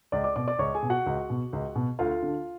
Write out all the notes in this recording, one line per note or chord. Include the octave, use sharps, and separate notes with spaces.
C#2 D5 D6
D5 D6
B2 D5 D6
D5 D6
C#2 C#5 C#6
G#4 G#5
B2
F#4 F#5
C#2
B2
C#2
B2
D2 F4 F5
D3